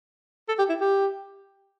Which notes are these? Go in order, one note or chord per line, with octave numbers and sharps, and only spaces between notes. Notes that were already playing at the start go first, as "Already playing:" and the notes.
A4
G4
E4
G4